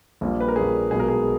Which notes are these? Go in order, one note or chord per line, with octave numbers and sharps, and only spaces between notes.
A#1 A#2 G3
B4
A#4
A#1 A#2 G3 G#4
B1 B2 G#3 B3 G#4
A#4
G#4